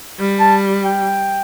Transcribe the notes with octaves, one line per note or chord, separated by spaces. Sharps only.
G3
A5
G5